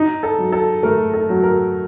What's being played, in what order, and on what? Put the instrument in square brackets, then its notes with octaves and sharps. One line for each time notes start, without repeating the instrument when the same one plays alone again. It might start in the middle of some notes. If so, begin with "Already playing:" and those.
Already playing: [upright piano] D#4
A4
F#3
A4
A3 A#4
A4
F#3
A#4